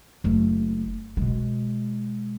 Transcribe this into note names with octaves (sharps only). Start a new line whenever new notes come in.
F#1 A3
B2 G#3